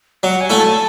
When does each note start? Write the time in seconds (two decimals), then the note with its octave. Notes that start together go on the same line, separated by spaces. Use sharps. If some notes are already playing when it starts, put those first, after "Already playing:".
0.23 F#3 F#5
0.41 G#5
0.50 A3 E4
0.58 A5